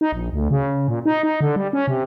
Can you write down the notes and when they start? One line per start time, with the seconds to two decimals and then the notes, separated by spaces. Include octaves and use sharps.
0.01 D#4
0.12 A#1
0.33 D2
0.51 C#3
0.88 A#2
1.06 D#4
1.23 D#4
1.41 D3
1.56 G3
1.73 C#4
1.87 C3